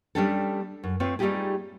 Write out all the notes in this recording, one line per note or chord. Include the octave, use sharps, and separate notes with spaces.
G3 A3 C#4 D4 G4 A4
F#2
A3 C4 F4 B4 C#5
G3 A3 D#4 F4 G4 G#4